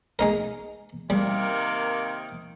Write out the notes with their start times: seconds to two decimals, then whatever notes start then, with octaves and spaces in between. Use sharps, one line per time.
0.19 G#3 D#4 A#4
1.10 C3 D#3 G3 A#3